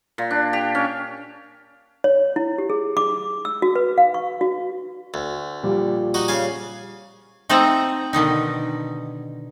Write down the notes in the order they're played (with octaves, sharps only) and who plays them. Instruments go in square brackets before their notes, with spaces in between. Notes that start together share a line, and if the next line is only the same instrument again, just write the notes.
[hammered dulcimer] A#2
D4
G4
C#4
[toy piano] C#5
E4
G4
G#4
D6
E6
F#4
B4
F5
C#6
F#4
[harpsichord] D2
[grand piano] A#2 F3 G3
[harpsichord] D#4 F#4 D#5
C#3 F5 G#5
[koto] A3 C4 D#4 F#5 A5 A#5
B2 D3 D#3 D#4